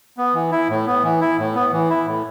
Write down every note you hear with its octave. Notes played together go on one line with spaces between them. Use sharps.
B3
E3
E4
A2
B3
E3
E4
A2
B3
E3
E4
A2